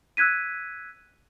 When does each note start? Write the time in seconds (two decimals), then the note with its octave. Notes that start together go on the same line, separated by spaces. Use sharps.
0.17 E6 F#6 G#6 B6 D#7